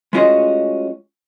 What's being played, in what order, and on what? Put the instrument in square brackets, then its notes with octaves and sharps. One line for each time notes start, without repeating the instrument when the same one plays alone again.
[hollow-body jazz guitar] G#3 A3 C#4 F4 F#4 D#5